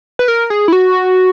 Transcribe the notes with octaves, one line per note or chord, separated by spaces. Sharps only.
B4
A#4
G#4
E4
F#4